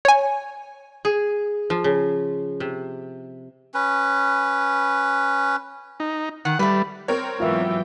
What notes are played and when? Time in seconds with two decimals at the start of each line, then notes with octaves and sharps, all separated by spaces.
0.05 C#5 G#5
1.05 G#4
1.70 F3
1.84 C#3
2.60 C3
3.74 C#4 B4
6.00 D#4
6.45 D#3 F#5
6.59 G3 A3 B4
7.08 C4 A#4 C#5
7.40 G#2 E3 F#3 B3 F4 E5 G5